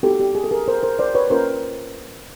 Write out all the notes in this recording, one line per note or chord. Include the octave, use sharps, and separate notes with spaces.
B3 D#4 F#4 G4 A4
G4
G#4
A4
G#4 A#4
A#4 C5
A#4 C5
C5 D5
B4 C#5
A#3 C#4 F4 A#4 C5